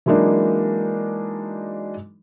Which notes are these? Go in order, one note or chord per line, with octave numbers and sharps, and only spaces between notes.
E3 F#3 G#3 A#3 D4 D#4